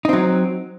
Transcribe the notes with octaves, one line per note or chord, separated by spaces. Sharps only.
F#3 C4 D#4